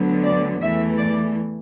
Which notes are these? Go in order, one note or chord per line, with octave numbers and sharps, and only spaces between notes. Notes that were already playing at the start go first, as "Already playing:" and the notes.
Already playing: D2 D3 F#3 B3
D5
E2 E3 A3 E5
D5